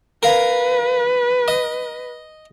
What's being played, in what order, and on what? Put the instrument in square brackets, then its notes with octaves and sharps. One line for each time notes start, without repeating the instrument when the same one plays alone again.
[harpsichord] A#4 F5 [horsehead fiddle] B4
[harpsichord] D#5